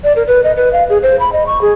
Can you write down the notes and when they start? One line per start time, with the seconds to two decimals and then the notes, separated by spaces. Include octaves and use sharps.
0.04 D5
0.16 A#4
0.27 B4
0.44 D#5
0.57 B4
0.73 F5
0.90 G#4
1.03 C5
1.20 B5
1.33 D#5
1.47 C#6
1.61 G#4